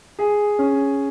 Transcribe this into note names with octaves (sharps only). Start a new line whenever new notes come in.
G#4
C#4